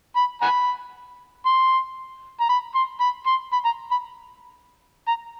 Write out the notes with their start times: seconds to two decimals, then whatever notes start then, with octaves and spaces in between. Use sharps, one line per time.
0.16 B5
0.42 F#5 G#5 B5
1.46 C6
2.41 A#5
2.49 B5
2.75 C6
3.00 B5
3.26 C6
3.53 B5
3.65 A#5
3.91 B5
5.08 A#5